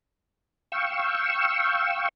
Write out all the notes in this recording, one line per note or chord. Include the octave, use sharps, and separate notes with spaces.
F5 G5 C#6 E6